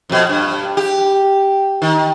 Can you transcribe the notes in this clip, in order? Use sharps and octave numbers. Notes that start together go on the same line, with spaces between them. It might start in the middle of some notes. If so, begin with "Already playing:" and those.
F2 B2
G2
G4
D#3